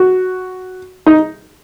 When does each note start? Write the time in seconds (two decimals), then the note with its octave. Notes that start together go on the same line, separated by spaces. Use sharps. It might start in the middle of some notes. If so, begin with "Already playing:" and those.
Already playing: F#4
1.06 D#4